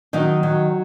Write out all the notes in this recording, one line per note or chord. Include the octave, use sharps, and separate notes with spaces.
D#3 F#3 D#4
F#3